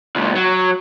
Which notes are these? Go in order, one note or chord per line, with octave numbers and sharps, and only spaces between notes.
C#2 A#2
F#3